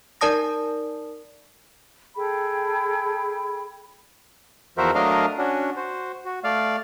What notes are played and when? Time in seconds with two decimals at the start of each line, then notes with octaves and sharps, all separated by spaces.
0.21 D#4 A#4 D5 A5 D#6 A#6
2.16 G#4 A4 G5 B5
4.78 E2 F3 F#4 A#4 C5 E5
4.95 F#3 A3 D4 A#4 D#5 F5
5.38 C#4 D4 F#4
5.76 F#4 C5
6.25 F#4
6.44 A3 D5 F5